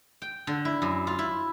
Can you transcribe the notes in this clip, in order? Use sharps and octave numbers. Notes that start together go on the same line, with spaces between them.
G5
D3
E4
F#2
F4
E4